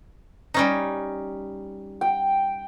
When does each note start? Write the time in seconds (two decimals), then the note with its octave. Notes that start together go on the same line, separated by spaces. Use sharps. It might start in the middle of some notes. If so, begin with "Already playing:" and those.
0.54 G3 C#4 D#4
2.01 G5